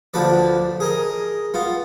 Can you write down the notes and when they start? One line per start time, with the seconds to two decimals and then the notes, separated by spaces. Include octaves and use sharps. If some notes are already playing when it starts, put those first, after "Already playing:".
0.14 D2 F3 D4 B4 D5
0.80 G#4 A#4 D#5
1.54 B3 F4